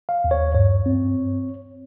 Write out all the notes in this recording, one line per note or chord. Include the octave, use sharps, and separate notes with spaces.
F5
D#2
C#5
G2 C#5
C4